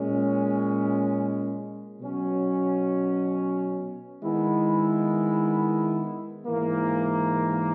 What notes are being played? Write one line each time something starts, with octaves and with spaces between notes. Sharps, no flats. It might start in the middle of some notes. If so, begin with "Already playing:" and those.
Already playing: A#2 G#3 C#4
B2 F#3 C#4
D#3 G#3 B3 E4
G#2 E3 A#3